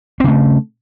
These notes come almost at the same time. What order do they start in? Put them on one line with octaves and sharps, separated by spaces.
C4 C#3 A3